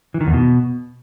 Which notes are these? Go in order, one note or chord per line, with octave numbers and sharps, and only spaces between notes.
E3
D#3
E2
B2